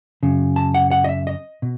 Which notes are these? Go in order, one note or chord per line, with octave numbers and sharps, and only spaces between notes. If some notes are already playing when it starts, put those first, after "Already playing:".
F#2 C#3
A5
F#5
F#5
D#5
E5
D#5
B2